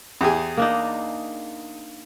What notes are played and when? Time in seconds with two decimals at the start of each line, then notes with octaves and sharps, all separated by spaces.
0.21 E2 G4 G#4
0.57 A#3 D4 D#4